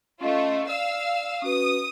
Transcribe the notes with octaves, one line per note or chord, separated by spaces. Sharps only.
A3 C#4 F4 D#5
D5 F5 E6
C#4 F#4 B4 D#6